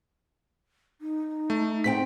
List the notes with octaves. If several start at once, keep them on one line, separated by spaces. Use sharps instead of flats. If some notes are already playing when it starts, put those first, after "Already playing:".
D#4
A3
A2 C4 G5 B6